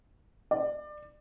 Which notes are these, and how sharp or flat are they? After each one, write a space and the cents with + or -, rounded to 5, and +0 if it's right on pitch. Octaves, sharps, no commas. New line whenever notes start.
D5 +25